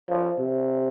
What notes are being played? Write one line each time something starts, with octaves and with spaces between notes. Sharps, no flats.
F3
C3